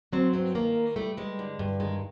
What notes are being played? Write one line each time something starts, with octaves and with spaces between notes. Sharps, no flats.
F#3 C4
G2 C4
D#3 A#3
G2
G3 A3
G2 G#3
D3
G2
D#3 G#3